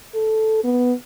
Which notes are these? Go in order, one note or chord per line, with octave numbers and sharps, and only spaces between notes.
A4
B3